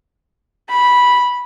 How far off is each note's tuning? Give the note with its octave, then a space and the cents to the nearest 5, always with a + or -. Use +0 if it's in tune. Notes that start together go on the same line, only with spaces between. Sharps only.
B5 -10